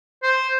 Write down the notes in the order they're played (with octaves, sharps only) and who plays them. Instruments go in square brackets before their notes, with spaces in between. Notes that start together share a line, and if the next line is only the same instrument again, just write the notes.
[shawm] C5